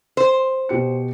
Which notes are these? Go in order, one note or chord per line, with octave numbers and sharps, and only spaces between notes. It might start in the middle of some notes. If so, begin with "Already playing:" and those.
C5
B2 G4 C#7